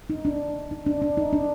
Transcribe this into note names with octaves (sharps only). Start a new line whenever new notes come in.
D#4
D4
D#4
D4
D4
D#4
D4